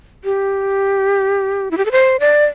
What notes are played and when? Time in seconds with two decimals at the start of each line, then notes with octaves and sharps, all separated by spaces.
0.24 G4
1.71 E4
1.77 G4
1.86 A4
1.92 C5
2.20 D5